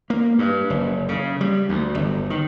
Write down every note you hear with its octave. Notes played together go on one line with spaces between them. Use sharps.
A#3
G2
F#1
C#3
G3
D2
G1
D#3